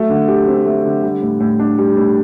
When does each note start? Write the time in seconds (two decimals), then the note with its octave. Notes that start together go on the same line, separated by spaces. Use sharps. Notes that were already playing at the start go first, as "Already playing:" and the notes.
Already playing: F#3 A3
0.10 D3
0.28 G4
0.47 C4
0.66 A3
0.85 D3
1.03 G3
1.22 A2
1.40 A2
1.59 D4
1.78 G3
1.97 A2